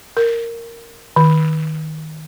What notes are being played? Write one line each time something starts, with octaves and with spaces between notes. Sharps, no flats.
A#4
D#3